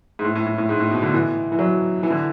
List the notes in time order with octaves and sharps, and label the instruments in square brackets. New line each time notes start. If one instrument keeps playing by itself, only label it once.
[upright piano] G#2
A2
A2
A2
A2
G#2
A2
B2
D3
E3
E3
F#3
E3
D3